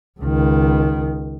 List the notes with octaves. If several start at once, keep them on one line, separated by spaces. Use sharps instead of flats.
C#2 D#3